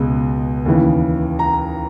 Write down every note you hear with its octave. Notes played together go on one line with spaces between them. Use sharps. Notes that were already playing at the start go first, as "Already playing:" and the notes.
Already playing: C#2 B2 G#3
D#2 C#3 E3
A#5